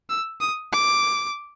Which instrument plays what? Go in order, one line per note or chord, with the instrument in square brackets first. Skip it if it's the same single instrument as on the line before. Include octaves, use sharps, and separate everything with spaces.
[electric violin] E6
D#6
D6